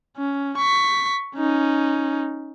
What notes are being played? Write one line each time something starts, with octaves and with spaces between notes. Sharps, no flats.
C#4
C#6 B6
C#4 D#4